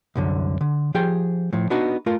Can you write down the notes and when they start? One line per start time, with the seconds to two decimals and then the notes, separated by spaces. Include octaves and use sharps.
0.15 C2 F#2 D3
0.61 D3
0.94 F3 G4 G#4 G5
1.53 A2 F3
1.70 B3 D4 D#4 F#4
2.06 A3 F4 A#4